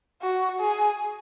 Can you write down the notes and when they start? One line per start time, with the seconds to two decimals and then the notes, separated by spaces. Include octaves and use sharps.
0.22 F#4
0.61 G#4